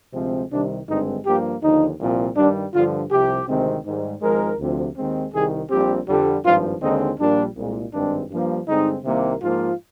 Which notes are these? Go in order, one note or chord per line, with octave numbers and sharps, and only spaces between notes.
D2 C3 F3 G#3 C4
C2 C3 D#3 G3 D4
G#1 G2 D3 G#3 C4 D#4
G2 F3 A#3 G4
D#2 D3 F3 D#4
C2 A#2 F3 C4
G2 D#3 G3 D4
G2 D3 F3 F4
C2 C3 F3 G4
D2 C3 D#3 G#3 C4
G#2 D#3 G3
G#1 G#2 F3 G#3 A#4
D2 C3 F3
D#2 D#3 G#3 C4
C2 C3 D#3 G#4
A#1 A#2 G3 C4 G4
F2 D3 G3
G#1 G2 F3 F4
D#2 D3 G#3 C4 D#4
A#1 A#2 G3 A#3 D4
C2 A#2 G#3
G#1 G2 D#3 G#3 C4 D4
G2 F3 A#3
G2 D3 G#3 C4 D#4
C2 C3 D#3 A#3
G#2 F3 A#3 F4